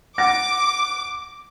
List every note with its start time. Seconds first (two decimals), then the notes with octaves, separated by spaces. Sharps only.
0.18 F#5 D6 A#6